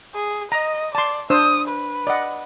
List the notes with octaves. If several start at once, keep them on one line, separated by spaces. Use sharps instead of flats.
G#4
D#5 A#5
D5 A5 C6
D4 C5 D#6 E6
B4
D5 D#5 F#5